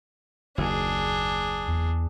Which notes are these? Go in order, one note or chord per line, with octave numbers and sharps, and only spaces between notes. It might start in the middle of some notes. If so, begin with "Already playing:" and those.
F#1 D#2 D4 G#4
E2